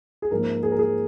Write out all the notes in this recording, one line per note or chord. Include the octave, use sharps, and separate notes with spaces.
G#4
G#2 F3 A#3 A#4
G#4
A#4
G#4